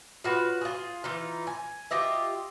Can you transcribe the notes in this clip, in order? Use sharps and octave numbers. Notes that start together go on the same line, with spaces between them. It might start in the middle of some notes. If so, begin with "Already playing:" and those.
F4 F#4 B4 C#5
F4 G#4
E3 D#4 F4
G#5
F4 G4 D#5 E5